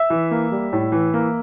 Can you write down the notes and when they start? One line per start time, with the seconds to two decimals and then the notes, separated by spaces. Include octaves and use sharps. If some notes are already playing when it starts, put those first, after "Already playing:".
Already playing: E5
0.10 E3
0.31 A#3
0.52 G3
0.73 A2
0.92 E3
1.14 A#3